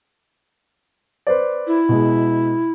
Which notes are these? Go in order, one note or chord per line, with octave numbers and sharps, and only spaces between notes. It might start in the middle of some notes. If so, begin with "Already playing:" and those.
B4 C5 D5
E4
B2 G#3